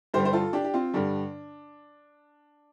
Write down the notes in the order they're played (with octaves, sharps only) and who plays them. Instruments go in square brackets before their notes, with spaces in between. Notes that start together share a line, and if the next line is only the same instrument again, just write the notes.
[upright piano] G2 D3 G3 G4 C5
C5
F4 A4
D4 G4
G4
C4 F4
G2 D3 G3 D4